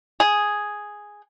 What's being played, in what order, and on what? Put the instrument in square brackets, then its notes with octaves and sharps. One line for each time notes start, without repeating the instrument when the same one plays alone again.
[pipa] G#4